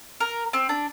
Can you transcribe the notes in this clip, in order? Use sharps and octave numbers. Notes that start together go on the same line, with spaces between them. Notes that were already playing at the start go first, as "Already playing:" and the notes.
A#4
C4
D4